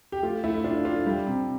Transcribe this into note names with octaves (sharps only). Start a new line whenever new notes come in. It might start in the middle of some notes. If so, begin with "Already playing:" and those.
G4
A3 F4
A3 E4
D4 F4
D4 F4
G3
C3